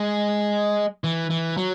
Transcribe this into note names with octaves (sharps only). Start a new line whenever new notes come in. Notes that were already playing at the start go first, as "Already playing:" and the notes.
Already playing: G#3
E3
E3
F#3